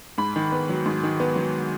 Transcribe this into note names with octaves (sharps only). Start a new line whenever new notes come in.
G#2 B5
D#3
B3
F#3
G#2
D#3
B3
F#3